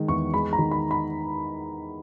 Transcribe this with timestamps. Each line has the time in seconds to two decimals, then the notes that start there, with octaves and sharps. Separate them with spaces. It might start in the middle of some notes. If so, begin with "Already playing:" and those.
Already playing: D#3 G#3
0.08 E2 C#6
0.33 G#3 B5
0.53 A#5
0.59 D#3
0.71 B5
0.91 B5